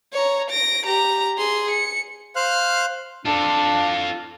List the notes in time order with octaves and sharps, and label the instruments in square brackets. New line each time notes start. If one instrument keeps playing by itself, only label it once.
[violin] C#5 A#5
A#6 D7
G4 A#5
G#4 C6
C#7
[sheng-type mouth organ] C5 F5 F6 F#6
[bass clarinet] D4 [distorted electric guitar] F4 A4